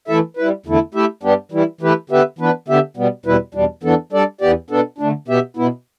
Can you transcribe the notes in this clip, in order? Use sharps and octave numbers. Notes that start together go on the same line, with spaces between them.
E3 A3 E4 A4 E5
G3 E4 B4
E2 D3 A3 E4
A3 E4 G4 E5
G2 G3 B3 D4 G4
E3 G3 E4
E3 A3 E4 G4 B4
D3 B3 G4 B4 E5
E3 B3 D4 B4
D3 B3 G4 E5
B2 G3 B3
E2 B2 G3 E4 B4
E2 B2 G3 D4
E2 E3 B3 D4 A4
G3 D4 A4 D5
E2 E3 B3 G4 D5
B2 B3 D4 A4
D3 A3 D4
B2 B3 G4 E5
B2 B3 E4